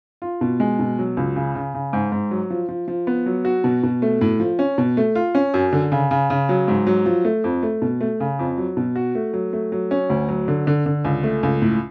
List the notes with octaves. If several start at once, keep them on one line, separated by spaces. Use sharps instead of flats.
F4
B2
G#3
B2
F#3
C#2
C#3
C#3
C#3
G#2
G#2
F#3
F3
F3
F3
B3
F#3
F#4
B2
B2
A3
A2
F3
C#4
B2
A3
F4
C#4
F#2
D3
C#3
C#3
C#3
F#3
G#2
F#3
F3
A3
F2
A3
B2
A3
C#3
F2
F#3
B2
F#4
A3
F#3
A3
F#3
C#4
D2
F#3
D3
D3
D3
C#2
A3
C#2
A2